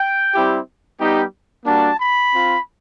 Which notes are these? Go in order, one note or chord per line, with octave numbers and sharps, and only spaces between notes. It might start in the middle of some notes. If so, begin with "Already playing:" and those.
Already playing: G5
G3 C4 E4 G4
G3 B3 D#4 G4
G3 A#3 D4 F#4 A5
B5
C4 F4